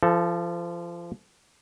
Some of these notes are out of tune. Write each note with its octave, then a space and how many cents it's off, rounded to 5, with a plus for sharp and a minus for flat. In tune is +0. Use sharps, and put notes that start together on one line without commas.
F3 -30 A4 +0